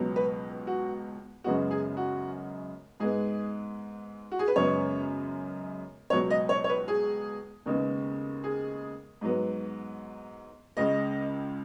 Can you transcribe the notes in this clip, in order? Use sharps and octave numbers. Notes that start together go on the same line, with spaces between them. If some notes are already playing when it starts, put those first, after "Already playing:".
Already playing: C#2 B2 F#3 B3
B4
F#4
F#2 C#3 G#3 B3 F#4
G#4
F#4
G#2 G#3 B3 G#4
F#4
G#4
B4
F#2 C#3 G#3 B3 C#5
C#2 B2 F#3 B3 C#5
D#5
C#5
C#5
B4
G#4
D#2 C#3 G#3 B3
G#4
G#2 F#3 B3
C#2 C#3 G#3 D#5